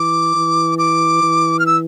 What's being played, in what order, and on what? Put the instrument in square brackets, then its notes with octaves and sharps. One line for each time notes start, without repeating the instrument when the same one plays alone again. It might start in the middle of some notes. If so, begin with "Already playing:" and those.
Already playing: [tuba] E3 [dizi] D6
[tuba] E3
[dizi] D6
[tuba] E3
[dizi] F6
E6